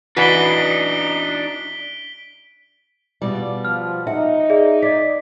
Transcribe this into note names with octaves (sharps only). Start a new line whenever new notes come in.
E3 D4 D#4 F#4 B4 B6 D7 G7
E2 B2 G3 F4 D5
F3 F6
D#4 E5 F#5
G#4 D5 E5
D5 D#5 B6